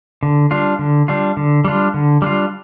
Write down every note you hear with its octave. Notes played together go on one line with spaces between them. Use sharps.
D3
G3 D4 F4
D3
G3 D4 F4
D3
G3 D4 F4
D3
G3 D4 F4